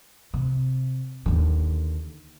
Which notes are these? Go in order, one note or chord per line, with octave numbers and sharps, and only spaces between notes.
C3
D#2 D3